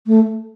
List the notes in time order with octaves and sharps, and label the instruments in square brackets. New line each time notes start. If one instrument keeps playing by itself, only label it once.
[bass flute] A3